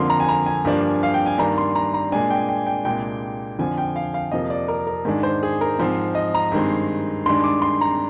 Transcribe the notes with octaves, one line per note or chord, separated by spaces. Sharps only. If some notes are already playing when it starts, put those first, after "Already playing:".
Already playing: F2 D3 F3 A#3 C6
A#5
G#5
A#5
G#5
G2 F3 A#3 D4
F5
G5
G#5
G2 D#3 A#3 D4 A#5
C6
A#5
A#5
A#2 G#3 D4 G#5
G5
G5
G5
C2 A#2 G#3 D4 G5
F2 D3 F3 G#5
G5
F5
F5
F2 C3 F3 A#3 D#5
D5
A#4
A#4
G#2 D#3 G#3 D4
C5
G#4
A#4
G#2 F3 C4
D#5
A#5
G2 D#3 G#3 C4
G2 D#3 G#3 D4 C6
D6
C6
A#5